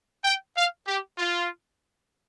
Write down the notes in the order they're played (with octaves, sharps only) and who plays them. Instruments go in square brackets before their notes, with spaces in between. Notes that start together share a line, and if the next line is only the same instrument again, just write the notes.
[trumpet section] G5
F5
G4
F4